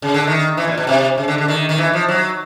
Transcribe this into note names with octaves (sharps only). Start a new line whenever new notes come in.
C#3
D3
D#3
E3
A#2
B2
C3
C#3
D3
D3
D#3
D#3
E3
F3
F#3